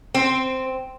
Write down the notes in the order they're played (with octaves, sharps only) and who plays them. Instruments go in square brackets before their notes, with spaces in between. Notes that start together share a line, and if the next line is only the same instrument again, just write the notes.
[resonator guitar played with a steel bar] C4